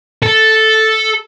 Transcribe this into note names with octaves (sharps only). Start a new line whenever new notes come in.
A4